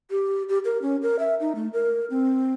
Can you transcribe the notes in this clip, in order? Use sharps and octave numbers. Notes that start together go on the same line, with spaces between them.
G4
G4
A#4
C#4
A#4
E5
D#4
A3
A#4
C4